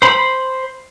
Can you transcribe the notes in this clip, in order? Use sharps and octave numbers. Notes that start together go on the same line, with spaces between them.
C5 B5